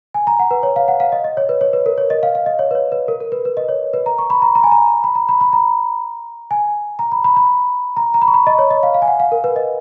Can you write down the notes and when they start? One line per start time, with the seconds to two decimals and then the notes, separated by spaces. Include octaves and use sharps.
0.14 G#5
0.27 A#5
0.39 F#5
0.51 B4
0.63 C#5
0.76 F5
0.88 F#5
1.00 F5
1.12 D#5
1.24 D#5
1.37 C#5
1.49 B4
1.61 C#5
1.73 B4
1.86 A#4
1.98 C#5
2.10 D#5
2.23 F5
2.35 F5
2.46 D#5
2.59 C#5
2.71 B4
2.75 C#5
2.92 B4
3.08 A#4
3.20 A#4
3.32 B4
3.45 B4
3.57 D#5
3.69 C#5
3.94 B4
4.06 A#5
4.18 C#6
4.30 B5
4.42 A#5
4.55 A#5
4.64 G#5
4.72 A#5
5.04 B5
5.15 A#5
5.29 B5
5.41 B5
5.53 A#5
6.51 G#5
6.99 A#5
7.12 B5
7.24 B5
7.36 B5
7.97 A#5
8.14 A#5
8.22 B5
8.28 C#6
8.34 B5
8.47 D#5
8.59 C#5
8.70 D#5
8.83 F5
8.94 F5
9.02 G#5
9.08 F#5
9.20 F5
9.32 A#4
9.44 B4
9.56 D#5